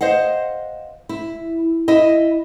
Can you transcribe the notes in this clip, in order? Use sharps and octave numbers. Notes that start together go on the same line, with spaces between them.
C5 D#5 F5 F#5
E4
E4 D#5